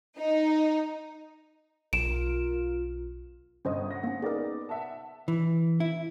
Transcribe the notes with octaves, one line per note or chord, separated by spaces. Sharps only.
D#4
B1 F4 A#4 D7 E7
G1 C#4 C5 D#5 D#6
F#5 A#6
A#3 C#4
B3 D#4 G#4 A#4 D5
E5 F#5 A5
E3
E4